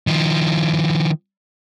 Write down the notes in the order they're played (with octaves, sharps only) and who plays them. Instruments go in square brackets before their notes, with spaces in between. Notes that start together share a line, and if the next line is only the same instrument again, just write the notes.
[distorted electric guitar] D#3 F3